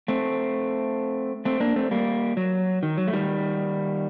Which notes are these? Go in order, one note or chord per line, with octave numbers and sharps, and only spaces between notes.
A3 C4
A3 C4
A#3 D4
A3 C4
G3 A#3
F#3
D#3
F#3
A3
D#3 G3